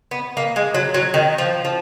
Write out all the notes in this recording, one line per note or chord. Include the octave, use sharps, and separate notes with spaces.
B3
A#3
G#3
F#3
F#3
D#3
F3
F3